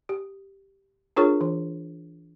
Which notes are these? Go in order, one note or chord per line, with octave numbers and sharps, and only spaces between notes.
G4
D4 F4 G#4 A#4 C#5 C#6
E3